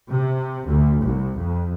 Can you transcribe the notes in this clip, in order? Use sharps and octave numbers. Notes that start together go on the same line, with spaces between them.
C3
D2
C2
F2